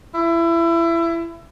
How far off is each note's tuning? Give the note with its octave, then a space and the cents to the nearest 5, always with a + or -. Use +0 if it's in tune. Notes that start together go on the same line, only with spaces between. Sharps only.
E4 +25